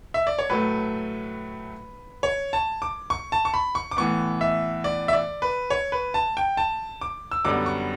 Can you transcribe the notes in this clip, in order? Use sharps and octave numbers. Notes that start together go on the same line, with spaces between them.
E5
D5
C#5
A2 F#3 A3 B4
C#5
A5
D6
C#6
A5
C#6
B5
C#6
D6
A2 E3 B3 C#6
E5
D5
E5
D5
B4
C#5
B4
A5
G5
A5
D6
E6
F#2 D3 G3 B3 D6
C#6